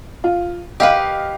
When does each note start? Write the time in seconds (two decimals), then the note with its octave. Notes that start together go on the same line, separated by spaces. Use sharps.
0.24 F4
0.80 G4 B4 D#5 F5